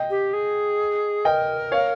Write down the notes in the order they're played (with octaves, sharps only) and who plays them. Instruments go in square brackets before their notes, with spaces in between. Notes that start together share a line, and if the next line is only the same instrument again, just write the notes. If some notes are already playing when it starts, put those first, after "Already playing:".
Already playing: [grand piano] D#5 G5
[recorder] G4
G#4
[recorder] A#4 [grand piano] D#5 G5
[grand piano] C#5 F5